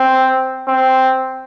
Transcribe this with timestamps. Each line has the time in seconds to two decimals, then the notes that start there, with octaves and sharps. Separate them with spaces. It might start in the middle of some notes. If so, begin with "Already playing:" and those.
Already playing: C4
0.68 C4